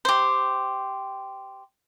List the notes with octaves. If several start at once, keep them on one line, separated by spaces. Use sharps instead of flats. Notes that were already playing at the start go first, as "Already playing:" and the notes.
G4 C5